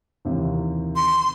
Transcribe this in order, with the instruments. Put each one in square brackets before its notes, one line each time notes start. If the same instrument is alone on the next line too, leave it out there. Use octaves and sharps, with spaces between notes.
[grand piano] D#2 C3 E3
[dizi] C6